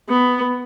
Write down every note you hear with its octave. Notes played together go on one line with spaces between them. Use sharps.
B3